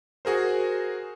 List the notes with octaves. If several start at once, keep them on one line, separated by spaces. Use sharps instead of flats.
F#4 G#4 A#4 C5